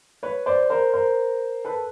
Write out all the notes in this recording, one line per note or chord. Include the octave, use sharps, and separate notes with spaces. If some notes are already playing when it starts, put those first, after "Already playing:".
B4 C#5
C5 D5
A#4 C5
A#4 C5
A4 B4